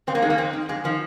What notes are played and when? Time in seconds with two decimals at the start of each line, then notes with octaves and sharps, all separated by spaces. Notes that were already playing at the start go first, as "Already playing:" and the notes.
0.07 F2 C4
0.15 A#3
0.22 D#3 G#3
0.30 A#3
0.38 F2 C4
0.53 D#3
0.69 F2 G#3
0.84 D#3 F3